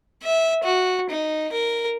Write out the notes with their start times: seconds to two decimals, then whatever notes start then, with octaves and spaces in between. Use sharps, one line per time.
0.23 E5
0.64 F#4
1.10 D#4
1.53 A#4